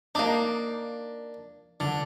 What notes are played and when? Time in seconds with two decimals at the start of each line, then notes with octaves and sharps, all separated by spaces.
0.15 A#3 D4 D#4
1.80 D3